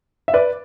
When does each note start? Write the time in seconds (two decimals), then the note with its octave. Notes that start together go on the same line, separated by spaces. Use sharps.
0.28 E5
0.34 B4 D5